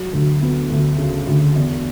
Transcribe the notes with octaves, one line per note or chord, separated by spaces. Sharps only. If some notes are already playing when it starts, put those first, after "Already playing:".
Already playing: F#3
D2
B3
D2
C#3
D2
E2